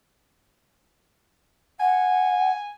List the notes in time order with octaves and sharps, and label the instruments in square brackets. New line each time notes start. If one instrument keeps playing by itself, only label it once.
[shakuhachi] F#5 [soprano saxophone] G#5